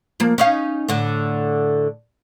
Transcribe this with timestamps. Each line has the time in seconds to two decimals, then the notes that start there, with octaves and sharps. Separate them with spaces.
0.20 F3 A#3
0.38 C#4 D#4 F5
0.89 A2 D3